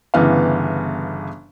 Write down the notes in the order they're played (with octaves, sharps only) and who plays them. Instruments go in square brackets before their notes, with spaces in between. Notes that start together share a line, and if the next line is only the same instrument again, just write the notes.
[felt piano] G1 C#3 E3 B3 F5